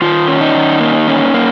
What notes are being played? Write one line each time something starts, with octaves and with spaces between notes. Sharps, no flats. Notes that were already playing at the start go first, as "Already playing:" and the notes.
D#3 F4
C#4
D#4
D#3
A#3
C#4
A#3